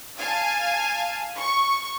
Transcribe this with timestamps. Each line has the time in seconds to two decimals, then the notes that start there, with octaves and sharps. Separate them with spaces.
0.18 F5 G#5 A5
1.37 C#6